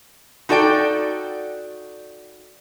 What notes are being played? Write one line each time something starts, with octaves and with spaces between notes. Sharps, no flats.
D#4 F#4 A4 D5 G5